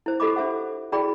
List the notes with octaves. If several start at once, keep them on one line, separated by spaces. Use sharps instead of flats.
E4 C5
F4 G4 A4 D#5 B5 D6
D4 C5 E5 F#5
E4 F#4 G#4 D5 G5 B5